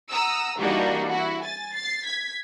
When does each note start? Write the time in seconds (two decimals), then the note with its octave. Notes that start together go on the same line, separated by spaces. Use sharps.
0.10 F#5 A#5 D#6 E6
0.58 E3 G3 A#3 D4 D#4 F#4
1.07 E4 F#4
1.42 G#5 A6
1.73 A6 C7
2.04 G#6 B6